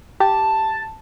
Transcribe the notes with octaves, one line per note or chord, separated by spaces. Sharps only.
G4 A5